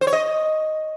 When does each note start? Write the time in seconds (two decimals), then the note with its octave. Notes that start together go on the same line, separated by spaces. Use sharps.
0.01 C5
0.07 C#5
0.13 D#5